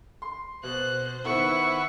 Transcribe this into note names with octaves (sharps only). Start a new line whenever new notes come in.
C6
B2 C5 F#6
D#3 B3 E4 B4 F#5 C#6